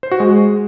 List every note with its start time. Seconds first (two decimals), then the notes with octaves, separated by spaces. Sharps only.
0.03 C5
0.11 F#4
0.20 G#3